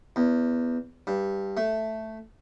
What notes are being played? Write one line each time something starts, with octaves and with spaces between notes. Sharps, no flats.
E2
G2
A3